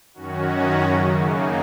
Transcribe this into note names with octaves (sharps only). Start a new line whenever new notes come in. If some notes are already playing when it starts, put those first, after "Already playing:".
F#2 D#3 C#4 F#4
F#2 C#3
A#3 D#4